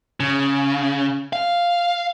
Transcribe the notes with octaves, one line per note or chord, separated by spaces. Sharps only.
C#3
F5